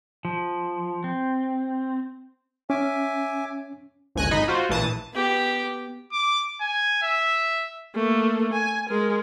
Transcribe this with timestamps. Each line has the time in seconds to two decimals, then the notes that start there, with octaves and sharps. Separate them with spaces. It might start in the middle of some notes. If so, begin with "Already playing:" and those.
0.25 F3
1.04 C4
2.70 C#4 E5 G#5 D6
4.15 G1 C#2 G#5 F#6 A#6
4.31 G#1 D#4 D#5 B5
4.48 F4 F#4 C5
4.69 A#1 E3 A5 D#6
5.13 B3 G4
6.13 D6
6.61 G#5
7.03 E5
7.95 A3 A#3
8.53 G#5
8.89 G#3 A#4